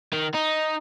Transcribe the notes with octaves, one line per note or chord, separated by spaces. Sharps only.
D#3
D#4